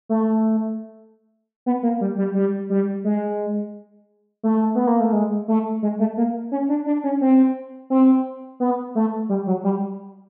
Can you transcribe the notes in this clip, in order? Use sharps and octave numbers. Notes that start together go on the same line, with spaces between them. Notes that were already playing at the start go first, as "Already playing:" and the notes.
A3
B3
A#3
G3
G3
G3
G3
G#3
A3
B3
A#3
A3
G#3
A3
G#3
A3
A#3
C#4
D4
D4
C#4
C4
C4
B3
A3
G3
F#3
G3